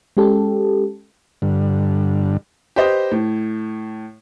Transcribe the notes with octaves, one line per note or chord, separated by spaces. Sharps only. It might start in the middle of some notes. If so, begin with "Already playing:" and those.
G#3 C#4 G4 A4
G2 D3
G4 B4 C5 D#5
A2